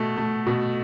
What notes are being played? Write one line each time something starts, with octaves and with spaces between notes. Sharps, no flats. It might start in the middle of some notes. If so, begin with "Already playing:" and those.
Already playing: B2 A3
A3
B2